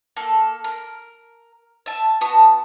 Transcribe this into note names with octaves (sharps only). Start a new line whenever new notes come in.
A#3 A4
A#4
E5 A5
B3 F#4 A5 D#6